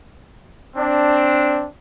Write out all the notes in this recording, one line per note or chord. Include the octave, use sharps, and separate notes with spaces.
C4 D4